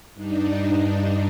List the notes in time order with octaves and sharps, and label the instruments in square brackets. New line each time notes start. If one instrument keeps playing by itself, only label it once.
[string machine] G2 D4 D#4